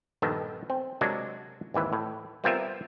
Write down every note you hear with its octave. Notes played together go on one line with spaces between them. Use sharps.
A#1 G2 D#3 B3 A4
C4
C3 F#3 G#3 D4 F#4 A#4
G#1 D#2 E3 B4
A2
G3 B3 C4 F4 A#4 E5